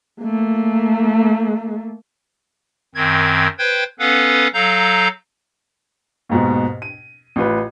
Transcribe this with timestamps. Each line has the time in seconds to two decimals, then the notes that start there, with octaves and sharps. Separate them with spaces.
0.22 A3 A#3
2.95 F#2 D#3 C4 G#6
3.59 B4 C5 G5 G#6
3.99 B3 C#4 A4 B4 F5 F#5
4.54 F#3 A4 F5 A#5 G6
6.29 D#2 G#2 B2
6.82 D#7
7.36 A1 F4 B4